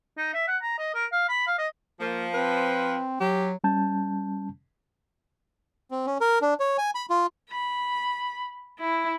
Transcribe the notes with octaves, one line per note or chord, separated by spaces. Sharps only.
D#4
E5
F#5
A#5
D#5
A#4
F5
B5
F5
D#5
F3 A#3
C4 B4
F#3 G4
G3 C#4 A5 G6
C4
C#4
A#4
D4
C#5
G#5
B5
F4
B5
E4